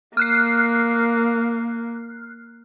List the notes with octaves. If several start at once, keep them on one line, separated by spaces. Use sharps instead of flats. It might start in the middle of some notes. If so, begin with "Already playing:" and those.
A#3 F6 F#6 C7